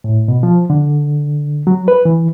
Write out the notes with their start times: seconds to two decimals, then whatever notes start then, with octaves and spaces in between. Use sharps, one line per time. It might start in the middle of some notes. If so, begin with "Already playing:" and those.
0.04 A2
0.28 B2
0.43 F3
0.70 D3
1.67 F#3
1.88 B4
2.05 E3